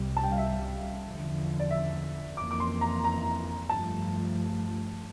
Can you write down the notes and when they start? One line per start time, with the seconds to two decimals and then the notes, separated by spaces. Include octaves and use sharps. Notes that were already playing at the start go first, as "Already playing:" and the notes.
Already playing: C2 C3 G3
0.17 A5
0.23 G5
0.32 F5
0.38 E5
1.05 E2 D3 F3
1.60 D5
1.71 E5
2.37 F2 E3 A#3 D6
2.51 D6
2.60 C6
2.81 A#5
3.04 A#5
3.70 G2 F3 A3 A5